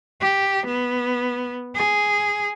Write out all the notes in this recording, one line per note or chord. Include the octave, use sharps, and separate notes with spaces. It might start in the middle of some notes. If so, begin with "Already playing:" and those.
G4
B3
G#4